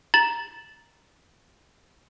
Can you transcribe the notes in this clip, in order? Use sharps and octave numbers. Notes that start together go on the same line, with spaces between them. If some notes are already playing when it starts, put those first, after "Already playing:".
A#5 A6 E7 F#7